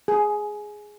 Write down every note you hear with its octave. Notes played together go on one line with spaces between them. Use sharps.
G#4